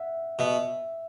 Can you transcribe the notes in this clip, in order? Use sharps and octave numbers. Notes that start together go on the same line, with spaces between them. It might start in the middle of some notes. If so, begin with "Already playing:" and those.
Already playing: E5 F#5
B2 E5